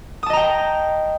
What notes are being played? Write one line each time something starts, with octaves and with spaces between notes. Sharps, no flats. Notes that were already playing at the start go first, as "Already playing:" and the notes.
D#5 G5 A5 A#5 D#6